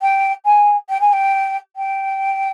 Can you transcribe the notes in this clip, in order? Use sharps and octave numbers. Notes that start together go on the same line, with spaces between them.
G5
G#5
G5
G#5
G5
G5